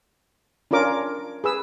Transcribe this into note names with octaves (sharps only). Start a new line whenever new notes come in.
C#4 D4 F4 A#4 D6
G#4 B4 E6